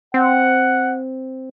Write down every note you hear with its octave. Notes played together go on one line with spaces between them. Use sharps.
C4 F#5